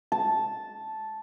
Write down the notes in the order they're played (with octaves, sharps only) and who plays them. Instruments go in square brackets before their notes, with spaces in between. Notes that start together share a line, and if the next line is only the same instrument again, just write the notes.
[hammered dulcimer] A5